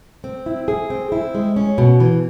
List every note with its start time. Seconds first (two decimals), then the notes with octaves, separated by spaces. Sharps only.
0.24 C4
0.46 E4
0.68 G#4
0.90 C4
1.12 E4
1.35 G#3
1.56 C#4
1.78 B2
2.00 E3